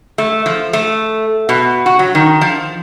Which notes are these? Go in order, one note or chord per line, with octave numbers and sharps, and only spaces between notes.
A3
F3
A3
B2
F#4
F#3
D#3
F3